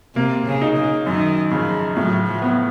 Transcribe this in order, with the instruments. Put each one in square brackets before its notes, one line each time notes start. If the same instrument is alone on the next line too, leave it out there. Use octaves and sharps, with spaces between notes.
[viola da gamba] C3 [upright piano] A#3
[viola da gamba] C#3
[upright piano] D#4
[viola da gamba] C#3
[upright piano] F#2 [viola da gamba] D#3
[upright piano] C#3 [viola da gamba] F3
[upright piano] A2 [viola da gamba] F#3
[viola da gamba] F3
[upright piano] B3